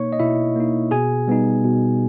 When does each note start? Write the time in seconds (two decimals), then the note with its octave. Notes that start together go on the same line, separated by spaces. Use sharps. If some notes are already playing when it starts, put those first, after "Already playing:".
Already playing: B2 A#3 D#4 C#5 C#6
0.13 D#5
0.19 B2 E4 E5
0.56 A#3 D#4
0.91 B2 G#4 G#5
1.28 G3 B3 D#4
1.64 B2